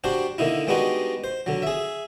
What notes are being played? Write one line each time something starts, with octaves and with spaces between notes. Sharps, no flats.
G3 D4 F#4 C5
D3 A#3 D#4 E4
G3 G#3 B3 D4 D#4 F#4
C5
D3 F#3
G#4 E5